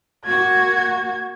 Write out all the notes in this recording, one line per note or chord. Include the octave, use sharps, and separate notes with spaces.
A#3 F#4 G#6